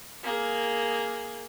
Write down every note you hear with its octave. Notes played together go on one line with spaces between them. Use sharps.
A#3 G#4